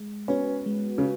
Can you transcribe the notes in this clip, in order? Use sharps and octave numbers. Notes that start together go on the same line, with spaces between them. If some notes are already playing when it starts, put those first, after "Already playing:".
Already playing: G#3
B3 C#4 F#4 B4
G#3
C#3